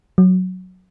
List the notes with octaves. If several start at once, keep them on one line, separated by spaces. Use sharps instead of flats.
F#3